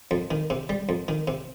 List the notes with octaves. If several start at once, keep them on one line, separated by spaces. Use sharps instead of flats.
F2
D#3
C3
G3
F2
D#3
C3